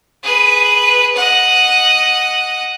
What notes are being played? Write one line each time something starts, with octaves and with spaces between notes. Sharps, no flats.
G#4 B4
D#5 F#5